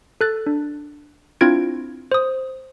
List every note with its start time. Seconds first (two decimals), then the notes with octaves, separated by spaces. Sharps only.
0.21 A4 F#6 A6
0.46 D4
1.41 C4 D4 E4 F4 G#6 D7
2.12 C5 D#6